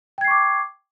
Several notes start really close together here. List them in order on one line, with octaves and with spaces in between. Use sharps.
G5 G#6 C7 C#6 D6